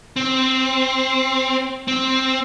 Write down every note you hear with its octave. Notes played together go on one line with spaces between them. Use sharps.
C4
C4